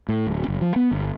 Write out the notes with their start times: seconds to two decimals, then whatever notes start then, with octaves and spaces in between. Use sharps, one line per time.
0.09 A2
0.27 D1
0.48 F#1
0.61 F3
0.76 B3
0.91 G1